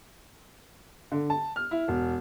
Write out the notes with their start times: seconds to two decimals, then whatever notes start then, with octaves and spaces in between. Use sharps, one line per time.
1.12 D3
1.30 A5
1.56 F6
1.71 E4
1.88 E1